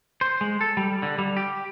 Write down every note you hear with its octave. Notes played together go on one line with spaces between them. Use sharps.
C5
G#3
A4
G3
D3
G3
G4